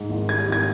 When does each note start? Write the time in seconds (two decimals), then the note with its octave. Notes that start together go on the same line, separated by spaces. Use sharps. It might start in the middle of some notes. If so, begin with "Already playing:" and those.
Already playing: G#2
0.09 G#1
0.29 G3 G#6
0.48 G#1 G#6